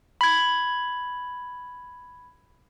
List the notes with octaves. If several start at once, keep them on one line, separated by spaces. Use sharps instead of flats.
B5 G#6